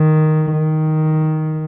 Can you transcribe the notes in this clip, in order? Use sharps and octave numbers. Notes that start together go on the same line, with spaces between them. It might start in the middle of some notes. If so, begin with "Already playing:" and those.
Already playing: D#3
D#3